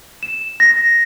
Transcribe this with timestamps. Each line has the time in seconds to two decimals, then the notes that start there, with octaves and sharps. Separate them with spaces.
0.23 E7
0.60 A#6